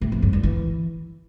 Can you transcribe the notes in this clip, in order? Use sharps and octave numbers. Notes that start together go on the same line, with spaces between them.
A2
F2
G2
G2
E3